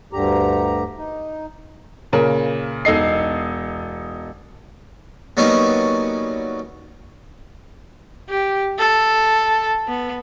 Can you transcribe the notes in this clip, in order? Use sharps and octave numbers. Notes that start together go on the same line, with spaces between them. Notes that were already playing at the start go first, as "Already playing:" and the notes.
D2 G2 D3 G4 A#5
D#4
A#2 C#3 A#4
E1 D#4 A4 D#5 C7
F#3 G3 A#3 B3 C#4 D#4
G4
A4
B3